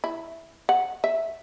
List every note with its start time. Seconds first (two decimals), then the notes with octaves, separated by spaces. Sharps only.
0.04 E4
0.69 F#5
1.04 E5